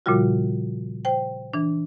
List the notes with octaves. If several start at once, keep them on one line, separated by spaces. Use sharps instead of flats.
A#2 C#3 F3 G3 F4 F#4
C5 G5
E3 D4